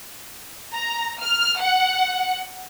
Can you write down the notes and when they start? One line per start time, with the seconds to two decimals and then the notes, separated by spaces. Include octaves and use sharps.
0.75 A#5
1.22 F6
1.60 F#5